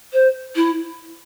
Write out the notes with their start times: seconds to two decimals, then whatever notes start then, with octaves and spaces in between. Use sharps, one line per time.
0.13 C5
0.56 E4